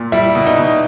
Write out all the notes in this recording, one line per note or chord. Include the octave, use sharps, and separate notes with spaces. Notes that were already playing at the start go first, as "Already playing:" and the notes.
Already playing: A#2
G3 E4
B2
D#4
B2